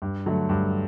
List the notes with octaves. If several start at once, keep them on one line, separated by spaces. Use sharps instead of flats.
G2
D3 F#3 A3
G2